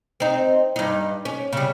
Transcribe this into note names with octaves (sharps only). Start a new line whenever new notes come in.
C4 D#4
G2 D#4
C#4
C#3 G3